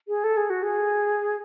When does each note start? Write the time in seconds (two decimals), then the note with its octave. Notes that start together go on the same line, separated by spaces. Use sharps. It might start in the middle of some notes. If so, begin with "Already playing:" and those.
0.08 G#4
0.24 A4
0.37 G#4
0.50 F#4
0.63 G#4